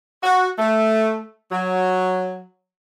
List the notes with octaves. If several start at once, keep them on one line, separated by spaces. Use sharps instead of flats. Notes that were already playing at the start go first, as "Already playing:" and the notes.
F#4
A3
F#3